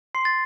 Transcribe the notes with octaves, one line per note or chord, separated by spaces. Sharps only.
C6 C7
A6